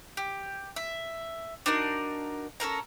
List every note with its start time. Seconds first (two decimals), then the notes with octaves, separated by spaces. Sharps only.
0.17 G4
0.76 E5
1.66 D4 D#4 F#4 A#4
2.60 C#4 A4 A#4 A#5